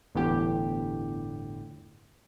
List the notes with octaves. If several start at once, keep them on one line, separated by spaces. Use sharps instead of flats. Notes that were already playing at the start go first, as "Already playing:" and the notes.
G1 E2 A2 G4